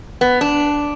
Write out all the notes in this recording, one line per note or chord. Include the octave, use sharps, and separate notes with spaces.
B3
D4